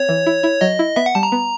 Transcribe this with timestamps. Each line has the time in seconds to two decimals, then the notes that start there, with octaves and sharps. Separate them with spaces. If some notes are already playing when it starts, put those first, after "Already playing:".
Already playing: C4 C#5
0.09 E3
0.27 E4
0.43 E4
0.61 F#3 D#5
0.79 E4
0.96 B3 E5
1.06 F#5
1.15 G3 A5
1.23 A#5
1.32 B3